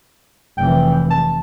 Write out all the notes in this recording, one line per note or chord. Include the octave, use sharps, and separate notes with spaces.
F1 E3 G5
A5